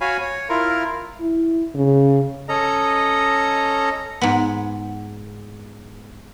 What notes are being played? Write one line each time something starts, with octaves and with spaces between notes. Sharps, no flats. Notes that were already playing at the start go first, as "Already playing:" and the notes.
F#4 C#5 F5 G#5 B5
C#5
E4 F4 A#4
E4
C#3
C#4 A4 D#5 A#5
G#2 B3